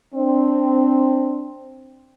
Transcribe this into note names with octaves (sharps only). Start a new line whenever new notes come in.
C4 D4